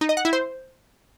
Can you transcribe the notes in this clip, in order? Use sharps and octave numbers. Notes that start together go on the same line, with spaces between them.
D#4
D#5
F#5
E4
C5